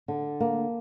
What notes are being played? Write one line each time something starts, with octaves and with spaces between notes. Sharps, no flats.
D3
A#3